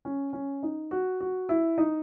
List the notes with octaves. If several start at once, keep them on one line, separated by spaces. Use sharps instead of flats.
C#4
C#4
D#4
F#4
F#4
E4
D#4